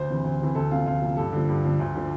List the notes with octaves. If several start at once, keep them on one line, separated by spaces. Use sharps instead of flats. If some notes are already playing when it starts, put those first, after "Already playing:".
Already playing: D2 C5
C3 E3
D2
C3 E3
D2 A4
C3 F3 F4
D2 F4
C3 F3
G2 A4
D3 F3
G2
D3 F3
D2
D3 F3